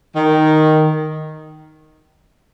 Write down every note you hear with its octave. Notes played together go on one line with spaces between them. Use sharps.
D#3